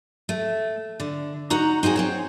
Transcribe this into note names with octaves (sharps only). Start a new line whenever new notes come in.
A3
D3
D#4 F#4 A#5
C4 D#4 F#4 G#4
C4 C5 C#5